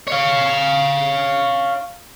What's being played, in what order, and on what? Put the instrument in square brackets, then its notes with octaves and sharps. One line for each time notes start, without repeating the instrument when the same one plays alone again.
[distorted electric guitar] C#5 F5